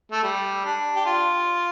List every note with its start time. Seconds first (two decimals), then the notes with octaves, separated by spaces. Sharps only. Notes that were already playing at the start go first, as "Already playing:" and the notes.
0.12 A3
0.23 G3
0.65 D4
0.96 G4
1.06 F4